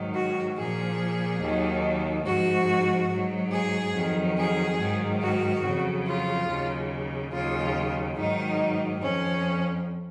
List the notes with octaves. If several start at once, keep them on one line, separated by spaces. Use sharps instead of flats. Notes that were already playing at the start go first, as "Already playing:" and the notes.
Already playing: G#2 D#3 F#3
F#4
A#2 F3 G#4
D#2 D#3 F#3
G#2 F3 F#4
G#2 F#3
G#4
F2 D#3 F#3
G#4
G#2 D#3 F#3
F#4
F2 C#3 F#3
F4
D#2 C#3 F#3
D#2 C#3 F#3 F4
G#2 D#3 F#3 D#4
F2 F3 C#4